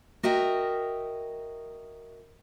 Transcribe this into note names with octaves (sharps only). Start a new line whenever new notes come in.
F#4 A#4 D#5 E5 G5